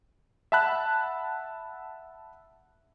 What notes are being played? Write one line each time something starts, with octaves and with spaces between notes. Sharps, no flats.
E5 F#5 A5 B5 F#6